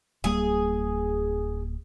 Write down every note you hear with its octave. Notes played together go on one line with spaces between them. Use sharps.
D1 G3 A#3 G#4